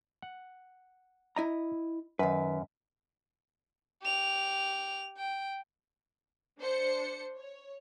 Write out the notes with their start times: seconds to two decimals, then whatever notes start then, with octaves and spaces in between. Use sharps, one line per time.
0.22 F#5
1.36 E4 D#5 A#5
2.19 F#2 D#3 B4
4.03 G4 F7
5.18 G5
6.59 D4 C5 C#7
7.36 C#5